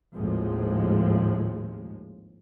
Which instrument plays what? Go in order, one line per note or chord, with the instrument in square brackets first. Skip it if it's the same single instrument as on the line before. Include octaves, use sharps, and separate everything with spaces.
[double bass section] G#1 D#2 A2 F3 G#3